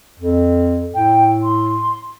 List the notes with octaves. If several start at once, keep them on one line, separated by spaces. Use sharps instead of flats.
F2
A2 G5
C6